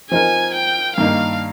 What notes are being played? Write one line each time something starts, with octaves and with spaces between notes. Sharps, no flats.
F3 C4 D#4 A#4 G#5
G5
G2 D#3 A#3 D#4 F5